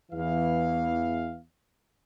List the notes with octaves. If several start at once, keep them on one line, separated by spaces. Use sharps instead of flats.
E2 E3 F5